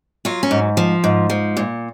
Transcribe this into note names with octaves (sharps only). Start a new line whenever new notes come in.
F#3 F4
C#4
G#2
F3
G#2
F3
A#2